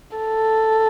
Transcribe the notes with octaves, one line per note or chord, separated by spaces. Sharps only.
A4